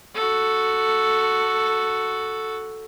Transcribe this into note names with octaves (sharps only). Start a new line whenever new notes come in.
F#4 A4